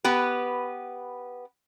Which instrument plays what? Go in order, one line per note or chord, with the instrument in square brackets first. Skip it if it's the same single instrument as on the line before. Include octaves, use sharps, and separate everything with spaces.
[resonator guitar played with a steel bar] B3 G4 B4